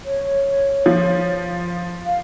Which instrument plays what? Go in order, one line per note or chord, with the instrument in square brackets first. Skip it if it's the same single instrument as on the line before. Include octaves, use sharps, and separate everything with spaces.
[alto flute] C#5
[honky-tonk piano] F3
[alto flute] F5